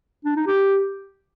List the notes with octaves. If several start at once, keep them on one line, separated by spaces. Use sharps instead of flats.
D4
D#4
G4